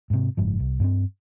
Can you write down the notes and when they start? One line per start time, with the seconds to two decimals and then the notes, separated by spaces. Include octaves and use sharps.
0.10 G#2 C3
0.37 F#1 G#2 F3
0.59 C2
0.80 G2 A#3 C4